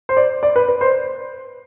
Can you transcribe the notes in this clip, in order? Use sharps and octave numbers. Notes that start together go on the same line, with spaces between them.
C5
D5
D5
B4
B4
C5